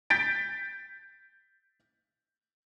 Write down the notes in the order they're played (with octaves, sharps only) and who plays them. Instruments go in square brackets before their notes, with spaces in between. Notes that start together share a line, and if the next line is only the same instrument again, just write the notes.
[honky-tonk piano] G6 A6 B6 D7